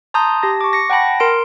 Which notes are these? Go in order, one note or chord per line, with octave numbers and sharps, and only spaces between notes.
A5 A#5 C6 D#6 G6
G4 A5 A#6
C#6 D6
A#6 C#7
F#5 G5 A5 B5 A#6
A#4 C6 D7